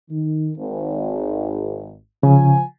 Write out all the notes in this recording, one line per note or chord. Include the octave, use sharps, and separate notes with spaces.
D#3
G#1
C#3 F3 G#5